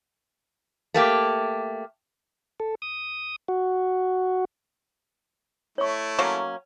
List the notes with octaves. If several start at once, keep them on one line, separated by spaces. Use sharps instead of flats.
A3 A#3 G4
A4
D#6
F#4
A3 E4 C#5 C#6
F#3 A#3 C#4